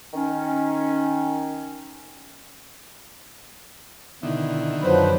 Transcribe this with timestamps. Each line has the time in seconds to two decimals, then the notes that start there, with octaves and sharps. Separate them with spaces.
0.13 D#3 C#4
4.23 B2 D3 D#3 E4
4.82 F#2 F3 F#3 B4 C5